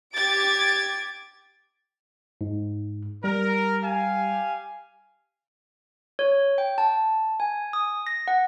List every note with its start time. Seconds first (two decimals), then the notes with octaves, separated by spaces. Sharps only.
0.14 G4 G#6 A6 D7
2.41 G#2
3.24 G3 A#4
3.83 G4 F5 G#5
6.19 C#5
6.58 G5
6.78 A5
7.40 G#5
7.73 D#6
8.07 A#6
8.28 F#5